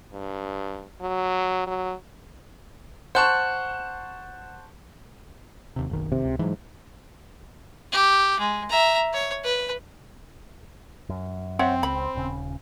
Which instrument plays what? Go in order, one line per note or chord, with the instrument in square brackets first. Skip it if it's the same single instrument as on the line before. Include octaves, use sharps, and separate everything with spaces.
[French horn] G2
F#3
F#3
[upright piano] C5 A5 C#6 [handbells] F#5 F#6
[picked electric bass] D#2 C3
F#1 B1 D#3
[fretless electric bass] C3
[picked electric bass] C#2
[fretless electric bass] G#2 [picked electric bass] E3 F#3
[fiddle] G4
G#3
E5 A#5
C#5
B4
[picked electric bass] F#2
[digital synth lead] C4 [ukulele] C#5 E5 F#5
[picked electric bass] C#2 [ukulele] B5
[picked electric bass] D#1 C#3